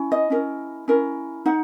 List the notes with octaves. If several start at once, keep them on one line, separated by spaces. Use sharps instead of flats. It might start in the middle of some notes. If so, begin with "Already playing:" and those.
Already playing: C#4 E4
D#5
C#4 E4 A#4
C#4 E4 A#4
D#4 F#5